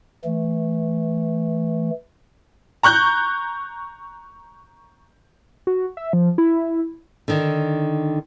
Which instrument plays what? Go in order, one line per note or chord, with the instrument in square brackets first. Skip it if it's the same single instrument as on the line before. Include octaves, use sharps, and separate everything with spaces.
[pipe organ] E3 A3
[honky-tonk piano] A#5 C#6 F#6 G6
[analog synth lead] F#4
E5
F3
E4
[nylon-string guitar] D3 D#3